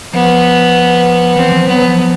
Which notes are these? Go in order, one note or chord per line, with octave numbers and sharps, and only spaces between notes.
F3 B3
E3 C4
F3
F#3 B3
F3